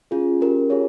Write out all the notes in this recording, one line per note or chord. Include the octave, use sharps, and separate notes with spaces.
C#4 F4 G#4
C#4 G4 A#4
F4 G#4 C#5